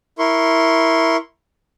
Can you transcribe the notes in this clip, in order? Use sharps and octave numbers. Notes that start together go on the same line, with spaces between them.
E4 A#4 C6 C#6